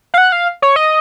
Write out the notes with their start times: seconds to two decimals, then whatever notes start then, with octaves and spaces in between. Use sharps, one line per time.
0.14 F5
0.18 F#5
0.32 F5
0.62 C#5
0.76 D#5